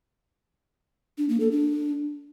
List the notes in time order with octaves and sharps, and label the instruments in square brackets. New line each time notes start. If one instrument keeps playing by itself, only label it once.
[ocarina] D4
A#3
A4
D4